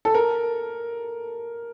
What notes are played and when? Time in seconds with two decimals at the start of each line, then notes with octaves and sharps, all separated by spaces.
0.05 A4
0.14 A#4